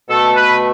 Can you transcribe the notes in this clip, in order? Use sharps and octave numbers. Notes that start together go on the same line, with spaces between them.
B2 A3 A4
B4